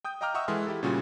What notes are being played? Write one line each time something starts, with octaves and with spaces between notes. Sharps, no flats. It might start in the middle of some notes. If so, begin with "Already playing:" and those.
G5 D#6 G6
D#5 F5 G5 A#5 D6 F6
D#5 E5 F#5 C#6 D#6 E6
E3 G#3 A4 G#5 C6 F6
E4 G4 A4
A#2 C#3 G3 C#4 F4 F#4